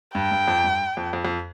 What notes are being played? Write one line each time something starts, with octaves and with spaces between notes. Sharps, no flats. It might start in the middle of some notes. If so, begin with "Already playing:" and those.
G2 G5
G2
F2
G2
F2
F2
F2